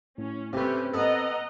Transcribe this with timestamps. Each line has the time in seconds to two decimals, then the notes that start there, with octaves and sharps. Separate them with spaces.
0.18 A2 C#4
0.53 C3 A3 C4 C#4 G4 B4
0.94 B3 A4 D#5 F#5 A#5